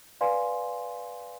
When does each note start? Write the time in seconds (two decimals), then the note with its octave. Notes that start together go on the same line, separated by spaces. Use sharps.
0.21 B4 D5 F5 G#5 C6